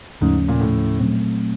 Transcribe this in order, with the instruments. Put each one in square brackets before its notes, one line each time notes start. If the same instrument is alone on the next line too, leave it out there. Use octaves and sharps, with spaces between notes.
[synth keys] D#2 C#3 F3 A3 C#4 [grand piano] G#2
[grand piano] A#2
A2
[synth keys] A#2 F#3 A3 C4